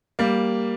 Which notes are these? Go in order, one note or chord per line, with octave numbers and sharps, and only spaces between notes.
G3 A#3